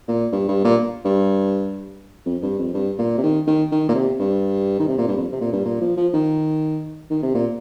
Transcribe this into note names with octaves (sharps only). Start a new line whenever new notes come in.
A#2
G2
G2
A#2
G2
F2
G2
F2
G2
A#2
C3
D#3
D#3
D#3
A#2
C3
G2
D#3
C3
A#2
G2
F2
C3
A#2
G2
A#2
F3
F3
D#3
D#3
C3
A#2